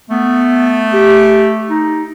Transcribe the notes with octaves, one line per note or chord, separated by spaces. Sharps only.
A3 B3
G4
D#4